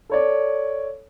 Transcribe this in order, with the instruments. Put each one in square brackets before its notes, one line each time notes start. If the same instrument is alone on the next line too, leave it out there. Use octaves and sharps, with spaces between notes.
[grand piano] A4 C#5 D5